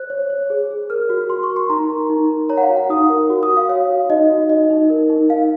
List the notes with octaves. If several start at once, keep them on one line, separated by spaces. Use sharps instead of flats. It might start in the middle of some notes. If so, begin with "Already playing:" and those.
Already playing: C5 F#6
C#5
C#5
G#4
G#4
A#4 F6
F#4
F#4 C6
C#6
A#4
C6
D#4 A#5
A#4
D#4
A#4
C#5 A#5
F#5
F5
F#4
F#5
D#4 D#6
A#4
F#4
D#6
F#4
F5
C#5 F5
F#4
D#4 D#5
F#4
D#4 D#5
D#4
A#4
D#4
D#4 F5